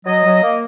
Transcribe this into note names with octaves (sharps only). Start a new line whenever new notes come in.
F#3 D#5
F#3
A#3